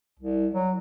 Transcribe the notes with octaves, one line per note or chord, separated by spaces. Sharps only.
C2
F#3